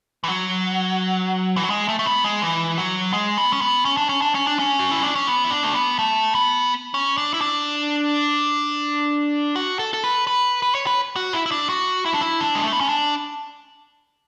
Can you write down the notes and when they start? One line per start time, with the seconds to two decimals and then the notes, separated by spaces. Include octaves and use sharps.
0.24 E3
0.28 F#3
1.56 E3
1.63 F#3
1.70 G#3
1.89 A3
1.99 A3
2.06 B3
2.24 G#3
2.42 E3
2.78 F#3
3.13 G#3
3.38 B3
3.53 C#4
3.61 B3
3.85 C#4
3.97 D4
4.09 C#4
4.22 D4
4.35 C#4
4.47 D4
4.59 C#4
4.79 F#4
4.91 E4
5.03 D4
5.16 C#4
5.27 B3
5.44 E4
5.51 D4
5.64 A3
5.75 B3
5.99 A3
6.35 B3
6.94 C#4
7.17 D4
7.34 E4
7.41 D4
9.56 F#4
9.79 A4
9.94 A4
10.04 B4
10.27 B4
10.62 B4
10.75 C#5
10.87 B4
11.16 F#4
11.34 E4
11.46 E4
11.51 D4
11.69 F#4
12.06 E4
12.13 D4
12.21 E4
12.41 D4
12.55 G#3
12.64 A3
12.73 B3
12.80 C#4
12.89 D4